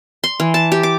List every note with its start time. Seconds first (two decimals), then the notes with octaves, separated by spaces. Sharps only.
0.24 C6
0.40 E3
0.54 A5
0.72 G4
0.83 D6